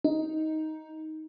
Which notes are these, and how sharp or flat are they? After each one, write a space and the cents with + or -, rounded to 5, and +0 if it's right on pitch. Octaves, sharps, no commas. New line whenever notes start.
D#4 +10